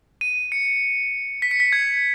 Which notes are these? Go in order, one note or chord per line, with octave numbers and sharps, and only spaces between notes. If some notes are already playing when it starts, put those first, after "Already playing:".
D#7
C#7
B6
C#7
B6
G#6